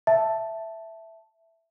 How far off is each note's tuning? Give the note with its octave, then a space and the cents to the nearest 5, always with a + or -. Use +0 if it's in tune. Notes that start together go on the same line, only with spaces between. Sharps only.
E5 +0 A5 +0